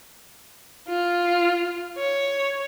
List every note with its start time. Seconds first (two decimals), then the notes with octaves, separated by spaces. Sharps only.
0.88 F4
1.97 C#5